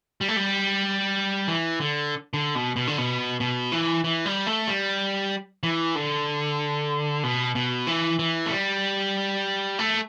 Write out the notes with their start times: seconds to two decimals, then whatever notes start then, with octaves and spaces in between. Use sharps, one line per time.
0.21 G3
0.28 A3
0.36 G3
1.48 E3
1.81 D3
2.34 D3
2.55 B2
2.76 B2
2.87 D3
2.98 B2
3.40 B2
3.72 E3
4.04 E3
4.26 G3
4.47 A3
4.68 G3
5.63 E3
5.95 D3
7.24 B2
7.55 B2
7.87 E3
8.19 E3
8.46 A3
8.51 G3
9.79 A3